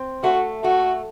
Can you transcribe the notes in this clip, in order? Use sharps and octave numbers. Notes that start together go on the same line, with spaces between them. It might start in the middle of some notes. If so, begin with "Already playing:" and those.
Already playing: C4
A3 F#4
A3 F#4